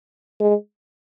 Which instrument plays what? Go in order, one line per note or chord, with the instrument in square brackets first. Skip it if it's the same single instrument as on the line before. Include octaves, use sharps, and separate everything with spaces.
[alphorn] G#3